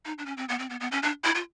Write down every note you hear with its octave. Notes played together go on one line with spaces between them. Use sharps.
D#4
D4
C#4
C4
B3
C4
B3
B3
C#4
D4
E4
F4